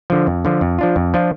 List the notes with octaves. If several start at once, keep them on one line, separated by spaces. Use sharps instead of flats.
D3 F3
F2
D3 F3
F2
F3 D4 F4
F2
F3 D4 F4